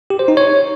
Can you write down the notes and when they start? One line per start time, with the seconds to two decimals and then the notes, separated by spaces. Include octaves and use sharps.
0.10 G4
0.19 C5
0.28 D#4
0.37 C#5